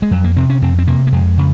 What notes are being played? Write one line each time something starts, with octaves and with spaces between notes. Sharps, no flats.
G#3
F2 F#3
A#3
C3 C4
C#4
F2 C4
C4
C3 A#3
A#3
F2 G#3
C#3